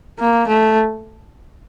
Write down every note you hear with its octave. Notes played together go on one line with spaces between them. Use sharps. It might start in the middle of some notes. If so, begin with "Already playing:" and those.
A#3
A3